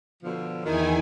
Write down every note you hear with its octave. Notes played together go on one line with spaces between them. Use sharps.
B2 D3 F3
E2 D#3 E4 G#5